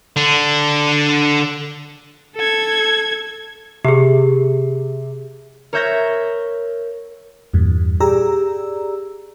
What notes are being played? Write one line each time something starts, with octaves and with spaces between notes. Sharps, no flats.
D3 D4
A4 G#6
C3 G4 G#4
A#4 C#5 E5 G6 G#6 A#6
E2 G2 A#2
G4 G#4 D5 A#5 E6